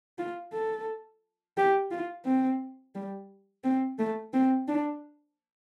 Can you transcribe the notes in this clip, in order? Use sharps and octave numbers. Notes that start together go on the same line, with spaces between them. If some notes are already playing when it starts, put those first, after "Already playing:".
F4
A4
G4
F4
C4
G3
C4
A3
C4
D4